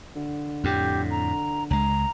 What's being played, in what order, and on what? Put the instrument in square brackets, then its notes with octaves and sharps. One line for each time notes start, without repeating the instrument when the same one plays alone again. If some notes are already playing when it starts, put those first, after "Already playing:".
[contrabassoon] D3
[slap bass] F2 A2 [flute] G4
[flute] A#5
[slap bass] C#2 G#3 [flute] A#5